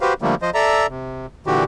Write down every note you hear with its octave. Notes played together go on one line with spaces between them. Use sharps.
F#4 G4 B4 C5 F5
D3 F3 G3 A3 A#3
F3 C5 D#5
A4 D5 E5 A#5
C3
A#2 D3 E3 F#4 G4